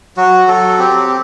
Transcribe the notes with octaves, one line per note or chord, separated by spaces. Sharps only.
F#3 F#4
F#3 A4
C4 G4